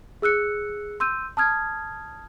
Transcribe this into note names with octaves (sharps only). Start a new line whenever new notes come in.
G#4 E6 F#6 C#7
C6 E6 G6 D#7
A5 D#6 F6 G#6